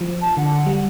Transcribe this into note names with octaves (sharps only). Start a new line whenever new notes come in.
F3
A5
D3 F#5
G3